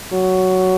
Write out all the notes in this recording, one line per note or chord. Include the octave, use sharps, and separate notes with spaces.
F#3